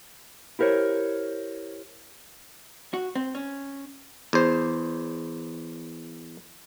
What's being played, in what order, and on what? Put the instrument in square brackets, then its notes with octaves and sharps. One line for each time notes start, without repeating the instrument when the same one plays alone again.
[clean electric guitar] E4 G4 A#4 C5 C#5
[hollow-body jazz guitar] F#4
C4
C#4
[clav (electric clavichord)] E2 C5